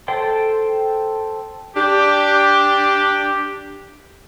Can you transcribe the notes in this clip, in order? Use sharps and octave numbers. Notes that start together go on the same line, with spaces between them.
A4 C5 G5 C6
D4 G4